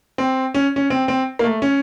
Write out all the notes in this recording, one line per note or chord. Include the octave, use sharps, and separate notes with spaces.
C4
C#4
C#4
C4
C4
A#3
A3
C#4